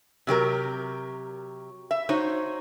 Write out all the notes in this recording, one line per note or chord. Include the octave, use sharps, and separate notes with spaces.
C3 F#3 G4 A#4
E5
D#4 F#4 C5 C#5